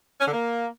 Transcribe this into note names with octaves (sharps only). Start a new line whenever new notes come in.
C#4
D3
A#3